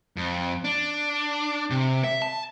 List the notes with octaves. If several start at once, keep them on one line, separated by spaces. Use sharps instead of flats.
F2
D4
C3
E5
A5